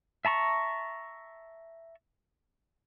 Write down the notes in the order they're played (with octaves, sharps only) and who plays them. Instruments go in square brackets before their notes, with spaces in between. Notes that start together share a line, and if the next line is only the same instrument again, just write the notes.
[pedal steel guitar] E5 A5 A#5 C#6